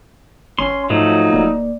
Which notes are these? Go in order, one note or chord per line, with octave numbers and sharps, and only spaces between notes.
G#1 C#4 C6
G#2 F3 F#3 A3 D#4
D1 A#3 D5